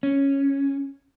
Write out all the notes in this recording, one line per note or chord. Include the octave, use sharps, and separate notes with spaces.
C#4